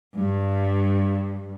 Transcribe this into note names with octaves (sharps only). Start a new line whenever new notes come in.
G2